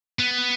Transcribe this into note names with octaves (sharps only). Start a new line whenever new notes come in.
B3